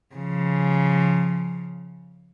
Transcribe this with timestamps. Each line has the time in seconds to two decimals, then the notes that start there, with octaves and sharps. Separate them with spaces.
0.15 C#3 F3